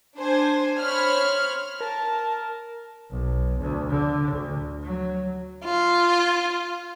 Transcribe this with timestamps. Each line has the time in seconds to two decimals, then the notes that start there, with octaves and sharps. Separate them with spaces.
0.16 D4 C5 G#5
0.80 C5 C#5 B5 F6
1.81 A#4 A5
3.10 B1
3.59 D2
3.89 D3
4.31 D2
4.83 F#3
5.64 F4